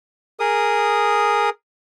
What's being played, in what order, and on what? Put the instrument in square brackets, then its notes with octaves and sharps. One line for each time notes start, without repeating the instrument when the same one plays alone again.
[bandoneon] G#4 A#4 D#6